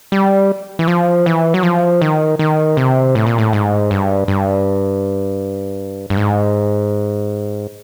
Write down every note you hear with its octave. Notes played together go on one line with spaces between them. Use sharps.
G3
E3
F3
E3
F#3
F3
D#3
D#3
C3
A2
A#2
A2
G#2
G2
G2
G2
G#2